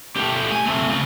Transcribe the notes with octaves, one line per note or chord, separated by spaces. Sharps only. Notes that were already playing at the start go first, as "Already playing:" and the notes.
A3 G4
G#5
A3 C4
C#3 F4